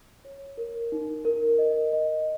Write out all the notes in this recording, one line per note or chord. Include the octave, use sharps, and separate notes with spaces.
C#5
A#4
D#4
A#4
D#5
D#5